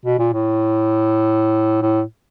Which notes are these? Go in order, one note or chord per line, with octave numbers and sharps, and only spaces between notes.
B2
A#2
A2
A2